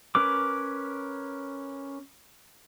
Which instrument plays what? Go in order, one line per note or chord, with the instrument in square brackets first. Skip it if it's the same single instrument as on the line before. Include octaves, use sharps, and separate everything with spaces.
[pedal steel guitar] C#4 A#4 B4 D6